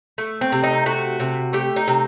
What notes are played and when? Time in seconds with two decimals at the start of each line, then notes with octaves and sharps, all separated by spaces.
0.18 A3
0.41 C4
0.52 C3
0.64 D#4
0.86 A3 F#4
1.20 C3
1.53 A3 G4
1.76 D#4
1.88 C3